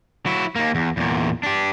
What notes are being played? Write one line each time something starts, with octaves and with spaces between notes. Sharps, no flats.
F#3 E4
D#2 A#3
E2
E2 A#2
D4 G4